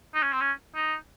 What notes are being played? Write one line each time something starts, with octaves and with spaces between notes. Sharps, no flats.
D#4
C#4
C4
C#4
D#4